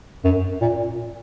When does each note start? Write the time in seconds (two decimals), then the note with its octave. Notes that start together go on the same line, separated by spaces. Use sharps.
0.24 F#2
0.61 A#2